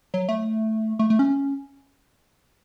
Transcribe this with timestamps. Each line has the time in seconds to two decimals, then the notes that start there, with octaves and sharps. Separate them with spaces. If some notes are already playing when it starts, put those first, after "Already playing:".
0.14 F#3
0.29 A3
0.99 A3
1.10 A3
1.19 C#4